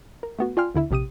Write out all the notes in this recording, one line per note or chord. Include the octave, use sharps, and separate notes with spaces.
A#4
A3 B3 F#4
F4 D5 G5 G#5 C6 F6
D#2 D3 E4 E5
A#1 C3 G4 D#6 D#7